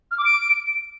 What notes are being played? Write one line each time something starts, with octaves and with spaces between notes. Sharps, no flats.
F6
D6
D7